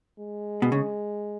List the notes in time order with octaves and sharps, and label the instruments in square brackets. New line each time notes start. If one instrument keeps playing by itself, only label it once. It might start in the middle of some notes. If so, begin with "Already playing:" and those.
[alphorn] G#3
[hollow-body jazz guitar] B2
C#3